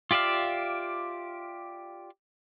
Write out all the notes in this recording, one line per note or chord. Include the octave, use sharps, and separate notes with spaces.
F4 G4 D5 E5 F5